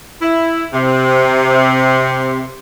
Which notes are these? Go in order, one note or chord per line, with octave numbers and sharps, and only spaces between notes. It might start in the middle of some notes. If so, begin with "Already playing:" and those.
E4
C3